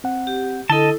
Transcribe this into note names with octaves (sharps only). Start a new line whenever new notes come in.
C4 F#5
G4
D3 E4 A4 D#5 A5